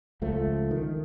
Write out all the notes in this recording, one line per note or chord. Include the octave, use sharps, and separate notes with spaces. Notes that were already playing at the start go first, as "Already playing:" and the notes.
C#2 F3 A3
D#3